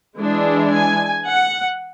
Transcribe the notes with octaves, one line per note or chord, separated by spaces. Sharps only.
E3 G#3 D4
G#5
F#5